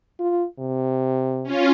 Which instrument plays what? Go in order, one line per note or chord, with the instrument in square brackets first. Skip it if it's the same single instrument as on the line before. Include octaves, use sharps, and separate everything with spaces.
[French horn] F4
C3
[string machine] C#4 F4